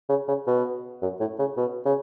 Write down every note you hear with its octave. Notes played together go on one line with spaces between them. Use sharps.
C#3
C#3
B2
F#2
A2
C#3
B2
C#3